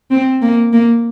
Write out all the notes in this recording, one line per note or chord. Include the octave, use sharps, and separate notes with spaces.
C4
A#3
A#3